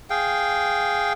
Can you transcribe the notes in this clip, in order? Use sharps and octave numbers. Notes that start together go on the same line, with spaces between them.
G#4 F5 G5